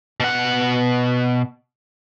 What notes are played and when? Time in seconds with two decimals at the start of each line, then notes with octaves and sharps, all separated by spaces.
0.20 B2 F#5